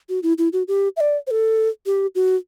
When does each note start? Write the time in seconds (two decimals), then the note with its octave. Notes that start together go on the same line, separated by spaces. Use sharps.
0.09 F#4
0.23 E4
0.38 E4
0.53 F#4
0.68 G4
0.97 E5
1.00 D5
1.27 C5
1.31 A4
1.86 G4
2.15 F#4